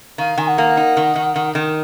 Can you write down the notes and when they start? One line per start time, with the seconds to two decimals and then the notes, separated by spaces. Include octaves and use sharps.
0.18 D#3 F5
0.38 D#3 G#5
0.48 F#5
0.58 A#3
0.77 D#4
0.97 D#3
1.16 D#3
1.36 D#3
1.55 D#3